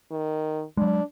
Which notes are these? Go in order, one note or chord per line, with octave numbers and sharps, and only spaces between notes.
D#3
F#3 G#3 D4